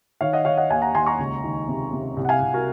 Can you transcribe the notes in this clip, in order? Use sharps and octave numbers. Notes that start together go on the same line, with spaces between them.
D#3 C#5 F5
D#5 F#5
D#3 C#5 F5
D#5 F#5
D#2 F5 G#5
F#5 A#5
D#2 G#5 C6
A#5 C#6
C#2
D#3
C3
C3
C2
F#5
F5 G#5
C2
F#4 A#4